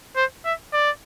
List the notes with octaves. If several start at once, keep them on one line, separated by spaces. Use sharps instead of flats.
C5
E5
D5